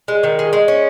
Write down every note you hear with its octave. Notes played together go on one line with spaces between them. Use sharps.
G#3
D#3
G#3
G#3
C#4